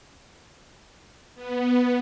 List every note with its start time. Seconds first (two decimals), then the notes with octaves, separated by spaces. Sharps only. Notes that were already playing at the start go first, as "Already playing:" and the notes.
1.35 B3